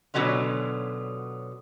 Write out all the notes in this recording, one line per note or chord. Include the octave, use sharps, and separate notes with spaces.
B2 D3 F#3 C#4 F4